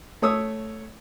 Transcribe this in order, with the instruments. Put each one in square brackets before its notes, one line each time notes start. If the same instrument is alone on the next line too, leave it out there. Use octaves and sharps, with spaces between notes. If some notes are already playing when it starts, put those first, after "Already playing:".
[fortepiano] A3 C#5 D#6 E6